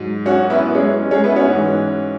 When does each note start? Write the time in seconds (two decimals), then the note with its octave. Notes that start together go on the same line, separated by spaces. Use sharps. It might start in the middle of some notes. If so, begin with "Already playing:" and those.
Already playing: G#2 F#3
0.26 C#4 F#4
0.50 B3 E4
0.75 G#3 C#4
1.11 G#3 C#4
1.24 B3 E4
1.36 C#4 F#4
1.48 G#2 E3